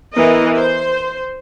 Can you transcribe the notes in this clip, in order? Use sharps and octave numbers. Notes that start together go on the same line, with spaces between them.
E3 B3 A#4 D#5
C5